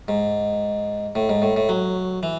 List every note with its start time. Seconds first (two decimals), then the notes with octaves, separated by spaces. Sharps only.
0.08 G#2
1.15 A2
1.29 G#2
1.42 A2
1.56 A2
1.69 F#3
2.23 E3